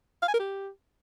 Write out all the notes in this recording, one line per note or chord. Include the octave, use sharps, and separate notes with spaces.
F5
G#5
A#4
G4